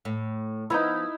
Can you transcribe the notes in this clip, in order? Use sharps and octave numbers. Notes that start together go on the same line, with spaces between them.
A2
F3 B3 D#4 E4